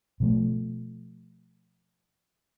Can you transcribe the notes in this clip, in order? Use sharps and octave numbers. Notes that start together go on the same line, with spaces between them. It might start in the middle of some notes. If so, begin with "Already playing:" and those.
B2 F3 A3